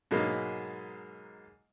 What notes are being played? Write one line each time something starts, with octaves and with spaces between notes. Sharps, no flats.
G#2 B2 F#3 G#3 A#3